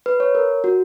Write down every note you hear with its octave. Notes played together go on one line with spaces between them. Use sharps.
B4
C#5
A#4
F#4